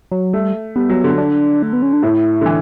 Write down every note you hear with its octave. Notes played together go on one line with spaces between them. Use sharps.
F#3
G3 A3
G3 B3
F#3
D3
D4
A3
B3
C#4
D4
A2 E4
D3
E3